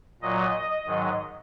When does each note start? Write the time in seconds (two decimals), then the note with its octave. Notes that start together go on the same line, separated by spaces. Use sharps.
0.22 A#2 F#3 D#5
0.86 G#2 D#3 F#3